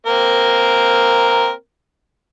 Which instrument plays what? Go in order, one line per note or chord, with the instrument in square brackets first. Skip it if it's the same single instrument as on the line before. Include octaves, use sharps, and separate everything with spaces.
[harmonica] A#3 C4 A#4